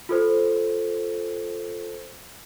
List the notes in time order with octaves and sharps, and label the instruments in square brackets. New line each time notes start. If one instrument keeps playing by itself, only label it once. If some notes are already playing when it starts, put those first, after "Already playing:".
[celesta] F4 A4 C5